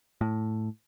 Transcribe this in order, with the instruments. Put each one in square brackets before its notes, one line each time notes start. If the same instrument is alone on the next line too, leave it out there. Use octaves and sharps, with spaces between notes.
[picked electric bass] A2